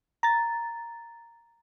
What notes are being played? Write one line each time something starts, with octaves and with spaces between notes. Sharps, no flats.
A#5 A6